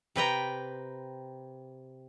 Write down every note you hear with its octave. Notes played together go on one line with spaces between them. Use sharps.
C3 B4 G5 A#5